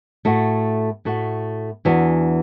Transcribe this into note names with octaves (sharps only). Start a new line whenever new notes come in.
A2 A3 F#4
A2 A3 F#4
E2 E3 D4 F#4